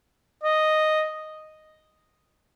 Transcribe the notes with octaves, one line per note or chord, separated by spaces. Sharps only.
D#5